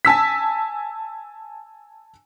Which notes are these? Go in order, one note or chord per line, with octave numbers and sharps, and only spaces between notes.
G#5 A5 E6 B6